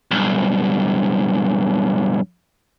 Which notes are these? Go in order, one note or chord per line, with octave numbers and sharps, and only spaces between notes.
B1 G2